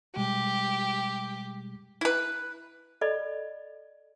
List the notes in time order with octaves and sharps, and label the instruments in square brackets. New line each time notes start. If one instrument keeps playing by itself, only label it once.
[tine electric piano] B2 G3 G#3 [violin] G4
[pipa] E4 B4
[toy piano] A4 D5 D#5 B5